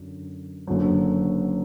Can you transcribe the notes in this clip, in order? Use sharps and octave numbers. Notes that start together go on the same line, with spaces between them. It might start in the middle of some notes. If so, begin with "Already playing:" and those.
Already playing: F#2 D3
F#1 F#2 D3 F#3